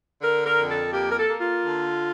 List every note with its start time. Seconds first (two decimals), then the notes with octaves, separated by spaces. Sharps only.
0.22 D3 A#4
0.45 A#4
0.57 F2
0.70 A4
0.92 A#3 G4
1.12 A#4
1.17 A4
1.29 A#3
1.41 F4
1.64 D3